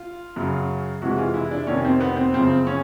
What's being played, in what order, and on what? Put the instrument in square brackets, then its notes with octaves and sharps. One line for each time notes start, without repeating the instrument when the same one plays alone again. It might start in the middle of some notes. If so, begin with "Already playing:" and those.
Already playing: [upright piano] F4
F#2 C#3 F#3
F2 C3 E3 G#3 F#4
F4
E4
D4
F2 C3 D#3 C#4
C4
B3
C4
F#2 C#3 F3 C4
C#4